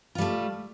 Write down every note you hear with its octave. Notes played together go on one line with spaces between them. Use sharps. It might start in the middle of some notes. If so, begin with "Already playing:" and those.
G3 A3 F4